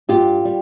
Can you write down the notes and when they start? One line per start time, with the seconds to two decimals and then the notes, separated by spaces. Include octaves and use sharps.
0.09 G2 F4 G4
0.45 G3